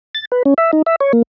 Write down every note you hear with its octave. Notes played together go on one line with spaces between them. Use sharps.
A6
B4
C#4
E5
D#4
E5
C#5
A#3